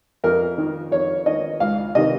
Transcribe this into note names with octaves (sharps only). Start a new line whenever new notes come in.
F2 A#4
D#3
F2 C#5
D#3 D#5
C#2 F5
C3 D#3 D#5